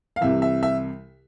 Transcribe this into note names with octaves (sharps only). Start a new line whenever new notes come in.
F5
C2 C3 E3 E5
E5
E5